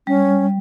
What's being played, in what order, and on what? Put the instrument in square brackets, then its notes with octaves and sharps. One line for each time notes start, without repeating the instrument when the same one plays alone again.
[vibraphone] G3 [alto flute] C#4